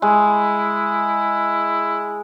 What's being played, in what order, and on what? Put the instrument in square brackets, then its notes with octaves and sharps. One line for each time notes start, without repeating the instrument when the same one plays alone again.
[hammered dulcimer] G#3 [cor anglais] E4